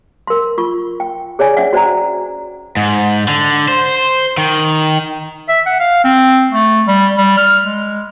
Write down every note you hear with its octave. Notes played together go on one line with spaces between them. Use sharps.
A#4 C6
F4 C#6
G5
G#4 C#5 D5 G#5
C#4 D4 E5 F#5
F#4 C5 D5 A#5
G#2
D3
C5
D#3
E5
F#5
F5
C4
A3
G3
G3
F6
G#3